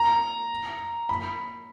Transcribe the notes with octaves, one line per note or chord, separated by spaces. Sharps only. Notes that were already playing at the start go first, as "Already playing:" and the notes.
Already playing: A#5
B5